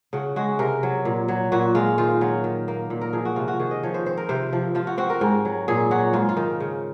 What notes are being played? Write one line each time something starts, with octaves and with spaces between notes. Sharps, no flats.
C#3 F#4
G#3 F#4
C3 A#4
F#3
A#2
F#3
A#2 F#4
G#3 F4
D#3 F4
F#3 F4
D#3
A#3
A#2
A#4
F3 G#4
F#4
C3 F4
F#4
D#3 G#4
D#5
F3 C#5
C5
C4 C5
A#4
C3 C5
F3
F3 F4
F#4
C4 F#4
A#4
G#2
F#3
A#2 G#4
F#3 F#4
G#2 F4
F4
D#3
C#3